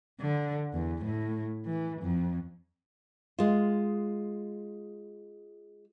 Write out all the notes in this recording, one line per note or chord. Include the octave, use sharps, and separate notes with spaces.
D3
E2
A2
E3
F2
G#3 F4